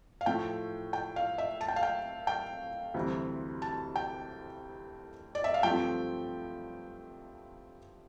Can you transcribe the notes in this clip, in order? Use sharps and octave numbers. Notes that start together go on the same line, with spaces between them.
F5
A2 F3 A3 G5
G5
F5
E5
A5
G5
F5
G5
G5
D2 C3 E3 G3 C4
A5
G5
D5
E5
F5
G2 F3 A3 C4 G5